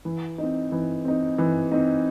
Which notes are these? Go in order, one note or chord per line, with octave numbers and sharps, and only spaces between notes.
E3
C4 D#4
E3
C4 D#4
E3
C4 D#4